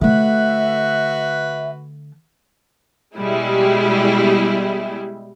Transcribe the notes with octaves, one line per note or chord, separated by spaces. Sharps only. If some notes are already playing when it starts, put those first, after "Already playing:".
D3 A3 F#4 B4 E5
B2 G3 G#3 E4